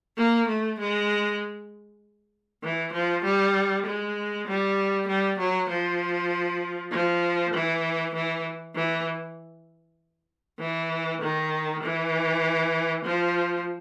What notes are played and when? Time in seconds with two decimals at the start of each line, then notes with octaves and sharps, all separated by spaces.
0.17 A#3
0.48 A3
0.79 G#3
2.63 E3
2.93 F3
3.24 G3
3.86 G#3
4.47 G3
5.08 G3
5.39 F#3
5.69 F3
6.92 F3
7.54 E3
8.15 E3
8.76 E3
10.59 E3
11.21 D#3
11.83 E3
13.05 F3